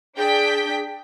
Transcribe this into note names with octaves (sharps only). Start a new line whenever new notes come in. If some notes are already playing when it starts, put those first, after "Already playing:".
D4 G#4 G5 B6